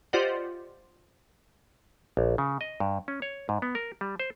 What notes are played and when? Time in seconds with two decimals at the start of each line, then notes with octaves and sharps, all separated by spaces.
0.13 F4 G4 C5 D5 D#5 F#5
2.17 A#1
2.38 C#3
2.61 D#5
2.80 G2
3.08 C#4
3.22 C#5
3.49 G#2
3.62 B3
3.75 A#4
4.01 G3
4.20 C5